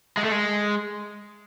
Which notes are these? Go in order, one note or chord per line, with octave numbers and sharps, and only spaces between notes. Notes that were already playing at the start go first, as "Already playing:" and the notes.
G#3
A3
G#3